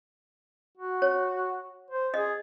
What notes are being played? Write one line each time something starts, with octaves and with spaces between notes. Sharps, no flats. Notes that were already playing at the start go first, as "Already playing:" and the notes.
F#4
C#5
C5
G#4 D#5